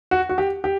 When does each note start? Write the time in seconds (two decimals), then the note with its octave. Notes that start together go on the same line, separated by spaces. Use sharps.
0.11 F#4
0.29 F#4
0.38 G4
0.64 G4